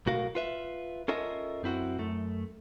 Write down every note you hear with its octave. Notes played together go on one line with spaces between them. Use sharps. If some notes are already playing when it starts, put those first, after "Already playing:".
B1 A2 F#4 A#4 F5
F4 B4 E5
C#4 F4 A4 A#4 D#5 E5
F#2 C4 E4 F#4
F#2 A3